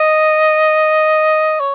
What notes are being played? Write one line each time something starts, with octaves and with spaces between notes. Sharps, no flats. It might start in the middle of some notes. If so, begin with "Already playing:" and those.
Already playing: D#5
C#5